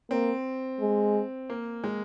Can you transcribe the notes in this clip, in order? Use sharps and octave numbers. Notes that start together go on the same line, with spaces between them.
A#3 C4
G#3
A#3
G#3